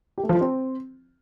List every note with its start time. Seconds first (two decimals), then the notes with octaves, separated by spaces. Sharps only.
0.18 G4
0.23 A3
0.29 F3
0.35 F4
0.41 C4